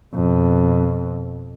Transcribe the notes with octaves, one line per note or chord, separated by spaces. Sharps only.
F2 B2